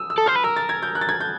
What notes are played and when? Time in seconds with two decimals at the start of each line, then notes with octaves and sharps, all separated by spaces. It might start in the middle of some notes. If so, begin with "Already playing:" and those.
Already playing: D#6 E6
0.10 E6
0.18 A4
0.26 C5 F6
0.35 B4
0.43 A#4 E6
0.56 A6
0.69 G#6
0.82 G6
0.95 F#6
1.01 A6
1.09 G#6
1.21 G6